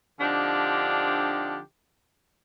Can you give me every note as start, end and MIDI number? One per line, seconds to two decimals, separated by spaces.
0.20 1.58 50
0.20 1.58 53
0.20 1.58 60
0.20 1.58 62
0.20 1.58 63
0.20 1.58 67